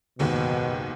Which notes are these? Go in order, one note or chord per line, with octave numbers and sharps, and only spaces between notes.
F#1 D#2 G#2 B2